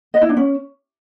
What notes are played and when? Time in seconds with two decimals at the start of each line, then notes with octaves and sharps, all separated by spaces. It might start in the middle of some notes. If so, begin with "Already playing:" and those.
0.14 D#5
0.21 E4
0.29 D4
0.37 C#4